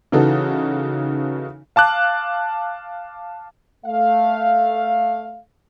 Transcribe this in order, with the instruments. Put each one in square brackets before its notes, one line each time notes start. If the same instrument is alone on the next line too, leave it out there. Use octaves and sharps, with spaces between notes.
[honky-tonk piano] C#3 E3 D#4 F#4 A4
[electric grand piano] F5 A5 D6 F#6
[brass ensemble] A3 F5